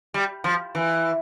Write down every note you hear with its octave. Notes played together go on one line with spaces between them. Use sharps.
G3
F3
E3